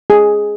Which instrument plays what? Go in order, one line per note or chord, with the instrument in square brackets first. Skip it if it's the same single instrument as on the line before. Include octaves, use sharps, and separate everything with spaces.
[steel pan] G#4